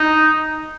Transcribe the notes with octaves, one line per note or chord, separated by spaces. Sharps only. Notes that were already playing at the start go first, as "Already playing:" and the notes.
Already playing: D#4